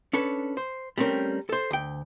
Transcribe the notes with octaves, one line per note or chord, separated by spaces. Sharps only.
C#4 D4 A4 B4 C#5
C5
G3 A3 C4 C#4 A#4
A4 C5
D2 G5